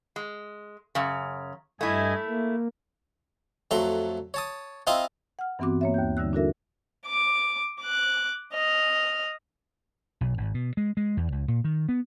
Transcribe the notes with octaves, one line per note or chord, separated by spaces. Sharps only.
G#3
F#2 C#3
G2 A3 E4 D#5 G#5
A#3
F2 F#3 A3 A#5 C6
C#5 A5 D#6
C4 E4 F4 D#5 A#5 C6
F#5 F6
G2 E3 B3 C4 F#4 D6
A#3 C#5 E5
D#2 G6
D3 G3 D#4 E6 F#6
D4 E4 F#4 A4 A#4 E5
D6
D6 F#6
D#5 F6
B1
G#1
B2
G#3
G#3
E2
C#2
A#2
D#3
B3